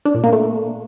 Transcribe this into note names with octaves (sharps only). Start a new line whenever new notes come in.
D4
A#2
A#3
A3